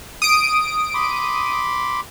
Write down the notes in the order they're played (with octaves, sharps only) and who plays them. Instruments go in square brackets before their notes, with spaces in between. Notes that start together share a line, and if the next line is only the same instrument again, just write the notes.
[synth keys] D#6 D7
[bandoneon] B5 C6 D6